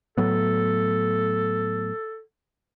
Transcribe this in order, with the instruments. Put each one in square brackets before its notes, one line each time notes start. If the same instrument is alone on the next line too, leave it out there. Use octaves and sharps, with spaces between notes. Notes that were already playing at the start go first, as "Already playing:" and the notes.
[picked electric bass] A2 F#3 B3 [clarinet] A4